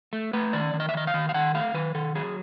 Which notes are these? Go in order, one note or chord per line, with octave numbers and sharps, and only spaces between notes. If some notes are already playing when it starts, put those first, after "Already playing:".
A3
A3 B4
D#3 D5
D#3
D#5
E5
D#3 D#5
F5
D#3
F5
D#3 F#5
A3 F5
D#3 B4
D#3 A4
F#3 G#4